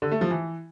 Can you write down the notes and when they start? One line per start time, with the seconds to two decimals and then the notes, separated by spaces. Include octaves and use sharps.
0.02 D3
0.12 A3
0.21 F3
0.31 E3